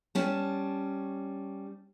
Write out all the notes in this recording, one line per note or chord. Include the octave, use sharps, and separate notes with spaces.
G3 C#4 A5